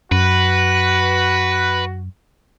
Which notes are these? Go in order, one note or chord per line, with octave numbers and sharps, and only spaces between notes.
F#2 F#4 B4